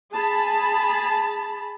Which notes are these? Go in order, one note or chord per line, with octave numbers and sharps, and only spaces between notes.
G#4 A5 B5